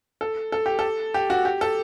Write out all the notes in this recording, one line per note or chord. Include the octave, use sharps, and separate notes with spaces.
A4
A4
G4
A4
G4
F#4
G4
A4